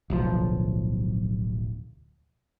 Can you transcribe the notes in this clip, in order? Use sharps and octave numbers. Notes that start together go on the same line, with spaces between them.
D1 B1 F3